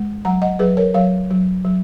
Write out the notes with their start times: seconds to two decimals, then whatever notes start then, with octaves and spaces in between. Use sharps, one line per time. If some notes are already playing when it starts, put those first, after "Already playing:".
Already playing: G#3
0.25 F#3 F#5 A#5
0.42 D#5 F#5
0.59 F#3 G#4 B4
0.77 A#4 C#5
0.94 F#3 C#5 F5
1.31 F#3
1.65 F#3